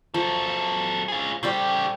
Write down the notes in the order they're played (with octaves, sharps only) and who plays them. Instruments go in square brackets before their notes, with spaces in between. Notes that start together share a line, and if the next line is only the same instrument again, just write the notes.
[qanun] F3 [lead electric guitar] F#3 A4
[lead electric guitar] F4 G#4
[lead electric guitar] C#3 G4 [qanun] G3 A4 C5